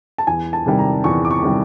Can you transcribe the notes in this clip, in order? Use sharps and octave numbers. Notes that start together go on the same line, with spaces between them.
A5
E2 G#5
A5
C3 D#3 G3
A#5
E2 C#6
D6
C#6
C3 D#3 G3